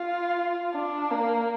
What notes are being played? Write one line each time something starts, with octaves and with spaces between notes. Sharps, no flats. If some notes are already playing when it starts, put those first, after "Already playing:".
Already playing: F4
D4
A#3